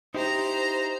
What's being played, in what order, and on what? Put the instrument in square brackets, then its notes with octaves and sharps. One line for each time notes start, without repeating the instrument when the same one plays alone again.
[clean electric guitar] D#4 E4 G4 [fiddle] C5 A#5